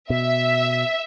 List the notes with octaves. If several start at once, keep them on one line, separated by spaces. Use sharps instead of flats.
B2 E5